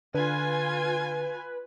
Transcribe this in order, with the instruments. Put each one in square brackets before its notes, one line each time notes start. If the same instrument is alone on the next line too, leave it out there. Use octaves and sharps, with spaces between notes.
[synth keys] D3 [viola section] F4 G#5 [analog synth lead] B4